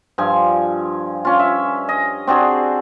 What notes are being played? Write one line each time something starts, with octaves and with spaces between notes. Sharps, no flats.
G2 F3 G#5
C#4 F4
E5
D#5
C4 D4 F#4 G#4